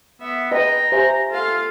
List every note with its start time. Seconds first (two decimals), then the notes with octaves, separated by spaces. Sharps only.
0.21 B3 E5
0.52 B4 D#5 G5 A#5
0.92 G4 C5 E5 G#5
1.30 F4 A4 F5